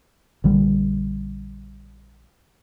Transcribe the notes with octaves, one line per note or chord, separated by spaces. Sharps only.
A#1 D3 G3